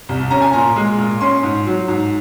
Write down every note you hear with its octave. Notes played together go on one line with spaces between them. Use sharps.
C2
C#4 A#5
G#5
A#2 A#5
G#3
A#2
C#4 C6
G#2
F#3
G#2